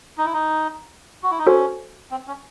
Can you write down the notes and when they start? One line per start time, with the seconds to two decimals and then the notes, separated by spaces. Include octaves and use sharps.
0.18 D#4
0.26 E4
0.34 D#4
1.23 F#4
1.31 E4
1.39 D#4
1.47 C#4 F#4 A4 C5
2.11 C4
2.27 C#4